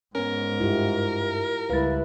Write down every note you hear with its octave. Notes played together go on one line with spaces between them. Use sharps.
G#2 B3 C#4 A#4
G2 E4 F4 G4
C#2 G3 E4 B4 F5 A6